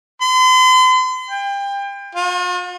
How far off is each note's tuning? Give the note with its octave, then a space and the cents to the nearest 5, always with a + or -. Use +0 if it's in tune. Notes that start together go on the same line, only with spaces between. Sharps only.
C6 -40
G5 +30
F4 +45